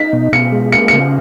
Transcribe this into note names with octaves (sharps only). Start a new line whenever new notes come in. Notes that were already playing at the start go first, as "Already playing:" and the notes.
Already playing: D#4 B6
B2
B2 C#7
G#3
A#3 C#7
C#3 C#7